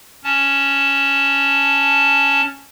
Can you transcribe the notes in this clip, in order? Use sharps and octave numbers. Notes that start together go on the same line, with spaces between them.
C#4 A5